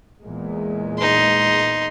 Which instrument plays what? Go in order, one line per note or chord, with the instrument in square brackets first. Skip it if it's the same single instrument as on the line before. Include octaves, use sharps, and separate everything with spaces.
[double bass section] E2 A#2 G#3
[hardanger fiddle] D#4 C6